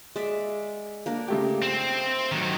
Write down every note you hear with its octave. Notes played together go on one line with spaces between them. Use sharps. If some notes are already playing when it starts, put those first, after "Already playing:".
G#3 D5 E5
A#3 D4 A#4
C#3 A3 G4
C4
D#3 F#3